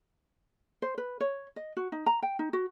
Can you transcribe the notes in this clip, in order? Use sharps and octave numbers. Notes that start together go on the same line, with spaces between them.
C5
B4
C#5
D#5
F#4
D#4
A#5
G5
D#4
F#4